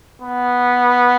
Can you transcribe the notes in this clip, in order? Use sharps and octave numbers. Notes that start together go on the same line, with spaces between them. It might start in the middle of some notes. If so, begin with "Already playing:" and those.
B3